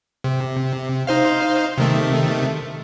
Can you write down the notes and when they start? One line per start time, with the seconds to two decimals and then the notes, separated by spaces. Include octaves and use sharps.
0.24 C3
1.07 D#4 C5 F5
1.78 C3 D#3 A3